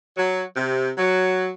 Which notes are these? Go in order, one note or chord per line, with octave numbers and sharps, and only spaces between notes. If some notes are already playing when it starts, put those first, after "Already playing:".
F#3
C3
F#3